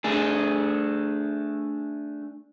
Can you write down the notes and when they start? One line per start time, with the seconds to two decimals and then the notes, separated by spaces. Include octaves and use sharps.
0.04 A3 D4 G#4